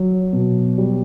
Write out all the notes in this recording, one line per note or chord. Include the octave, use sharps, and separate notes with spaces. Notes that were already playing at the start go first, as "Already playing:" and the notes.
Already playing: F#3
B2
G3